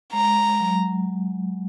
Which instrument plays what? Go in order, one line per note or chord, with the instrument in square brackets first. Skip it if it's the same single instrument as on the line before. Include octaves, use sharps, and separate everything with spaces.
[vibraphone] G#3 [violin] A#5
[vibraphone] F#3